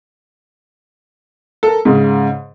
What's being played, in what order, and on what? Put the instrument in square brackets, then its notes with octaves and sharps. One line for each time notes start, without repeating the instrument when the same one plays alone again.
[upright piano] A4 A#4
G#2 C#3